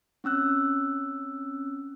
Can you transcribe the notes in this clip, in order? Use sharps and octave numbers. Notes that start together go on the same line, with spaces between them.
C4 C#4 E6 F#6